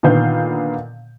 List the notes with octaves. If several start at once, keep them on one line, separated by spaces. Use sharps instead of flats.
A#2 D3 D#3 B3 F5 G6